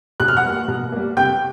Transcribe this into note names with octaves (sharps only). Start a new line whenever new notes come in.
B2 F#6
F6
F#5 F#6
G3 A#3
B2
G3 A#3
C3 G5 G6